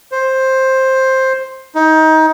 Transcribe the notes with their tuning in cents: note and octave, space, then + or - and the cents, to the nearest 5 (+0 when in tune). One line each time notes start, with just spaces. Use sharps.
C5 +10
D#4 +25